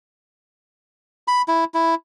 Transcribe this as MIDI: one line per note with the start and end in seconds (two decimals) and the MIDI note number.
1.28 1.42 83
1.48 1.64 64
1.74 1.95 64